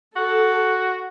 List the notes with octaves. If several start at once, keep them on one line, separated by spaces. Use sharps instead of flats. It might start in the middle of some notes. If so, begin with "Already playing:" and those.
F#4 A4